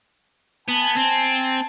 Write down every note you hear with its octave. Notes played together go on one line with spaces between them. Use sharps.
B3 G#5 A5
C4